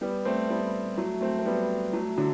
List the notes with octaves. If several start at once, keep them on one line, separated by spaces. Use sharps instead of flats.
G3 B3
A3 C4
G3 B3
F#3 A3
A3 C4
C4
G3 B3
F#3 A3
D3 F#3